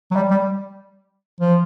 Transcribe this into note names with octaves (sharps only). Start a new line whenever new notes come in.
F#3
G3
G3
F3